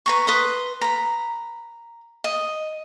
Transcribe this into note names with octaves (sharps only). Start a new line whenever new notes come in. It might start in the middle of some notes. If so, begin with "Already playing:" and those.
B4 A#5 C#6
B4 C6 D#6
A#5 B5
D#5